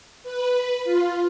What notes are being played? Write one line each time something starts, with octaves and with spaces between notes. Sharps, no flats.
B4
F4